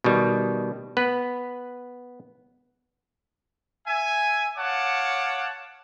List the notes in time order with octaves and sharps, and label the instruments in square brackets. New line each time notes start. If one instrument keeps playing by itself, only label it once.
[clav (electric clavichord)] B2 D#3 G3
B3 B4
[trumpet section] E5 G#5
C#5 F5 F#5 A5 D6